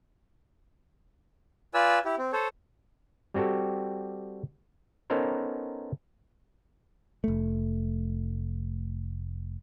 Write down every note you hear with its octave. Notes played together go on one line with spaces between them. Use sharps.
F4 B4 D5 G#5 E6
E4 G4
C4
A4 C5 C#5
G3 C4 F#4 G4 A4
B3 C#4 D#4 A4 A#4 C5
F1 A3